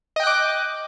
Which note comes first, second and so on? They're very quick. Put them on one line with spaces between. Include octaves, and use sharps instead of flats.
D#5 G5 F#6 D6